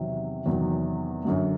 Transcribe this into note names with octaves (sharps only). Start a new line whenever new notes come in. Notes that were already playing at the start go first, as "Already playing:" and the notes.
Already playing: E2 C3 D#3 F#3
E2 C3 D#3 F#3
F#2 D3 F#3